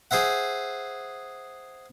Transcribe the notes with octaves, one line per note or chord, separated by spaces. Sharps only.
G#4 C5 E5 F#5